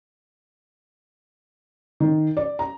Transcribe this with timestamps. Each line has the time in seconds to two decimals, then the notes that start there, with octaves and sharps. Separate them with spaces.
2.00 D#3
2.37 D5
2.59 A#5